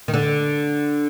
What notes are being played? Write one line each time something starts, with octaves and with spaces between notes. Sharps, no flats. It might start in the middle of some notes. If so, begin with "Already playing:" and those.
D#3
D3